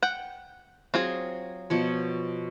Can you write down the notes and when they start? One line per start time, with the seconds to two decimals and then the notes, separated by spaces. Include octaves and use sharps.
0.02 F#5 G5
0.94 F#3 C4 F4 G#4
1.70 B2 F3 C#5